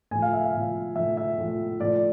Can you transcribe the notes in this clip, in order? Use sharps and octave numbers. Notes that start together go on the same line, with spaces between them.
A2 F3 G#5
F5
E5
F5
A2 F3
A2 F3 E5
E5
A2 F3
A2 F3 D5